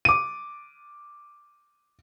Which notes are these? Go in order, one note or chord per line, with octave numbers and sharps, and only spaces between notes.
D6 D#7